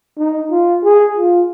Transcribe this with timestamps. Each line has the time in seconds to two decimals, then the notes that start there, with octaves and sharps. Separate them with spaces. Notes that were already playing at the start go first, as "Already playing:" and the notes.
0.18 D#4
0.51 F4
0.84 G#4
1.17 F4